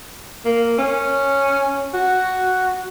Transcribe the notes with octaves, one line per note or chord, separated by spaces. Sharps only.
A#3
C#4
F#4